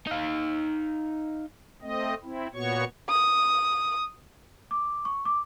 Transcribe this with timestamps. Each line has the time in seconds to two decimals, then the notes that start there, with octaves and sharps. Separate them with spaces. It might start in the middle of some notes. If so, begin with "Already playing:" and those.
0.07 D#4 F5
1.82 A3 C4 D#5
2.23 C4 E4
2.54 A#2 B3 F#4 C#5 C#6
3.09 D#6
4.71 D6
5.05 C#6
5.25 D6